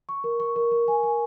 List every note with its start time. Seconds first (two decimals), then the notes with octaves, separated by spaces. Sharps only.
0.09 C#6
0.24 A#4
0.40 C#6
0.56 A#4
0.71 A#4
0.88 G#5
1.03 G#5